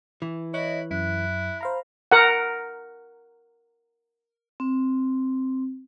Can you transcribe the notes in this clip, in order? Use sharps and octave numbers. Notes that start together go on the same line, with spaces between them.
E3
E4 C#5 D#5 F#6
F#2 E4 F#6
C5 F5 A#5 B5
A#4 F#5
C4